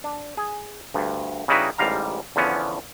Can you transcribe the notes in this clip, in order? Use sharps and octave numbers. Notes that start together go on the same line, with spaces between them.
D4
G#4
D2 G2
C#3 G3 D#4 E4 F#4 B4
A1 G#2 G3 F5 A#5
E2 D3 F3 B3 C#4